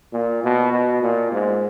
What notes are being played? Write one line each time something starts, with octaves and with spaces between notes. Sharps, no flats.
A#2
B2
B2
A#2
G#2